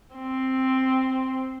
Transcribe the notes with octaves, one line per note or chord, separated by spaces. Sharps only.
C4